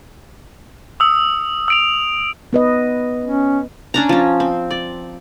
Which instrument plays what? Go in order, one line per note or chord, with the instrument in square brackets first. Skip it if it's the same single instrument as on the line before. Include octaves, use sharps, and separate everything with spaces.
[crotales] D#6 E6
E6 D7 F7
[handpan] B3 B4 D#5
[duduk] C#4
[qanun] C#4 D4 A#5
F3 C#4
C4
D5